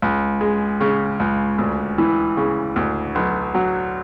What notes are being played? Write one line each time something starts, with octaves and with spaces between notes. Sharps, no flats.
C#2
G#3
C#3
C#2
D2
E3
C#3
D2
B1
F#3